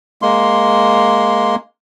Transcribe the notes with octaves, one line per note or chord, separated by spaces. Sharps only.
G#3 A#3 C6